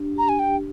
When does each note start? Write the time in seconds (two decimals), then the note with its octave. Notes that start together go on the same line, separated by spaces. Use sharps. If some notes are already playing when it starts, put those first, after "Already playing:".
Already playing: D4 G4
0.15 G4 A#5
0.29 G#5
0.39 G5
0.52 D4